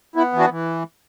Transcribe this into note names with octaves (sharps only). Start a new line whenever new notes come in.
B3 E4
E3
D4 F#4
E3